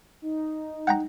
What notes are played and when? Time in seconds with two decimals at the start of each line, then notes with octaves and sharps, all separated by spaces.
0.22 D#4
0.87 F#5 G5 A#5